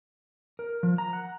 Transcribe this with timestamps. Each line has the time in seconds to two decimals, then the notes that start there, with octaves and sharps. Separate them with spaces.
0.59 A#4
0.83 F3
0.98 A#5
1.13 F#5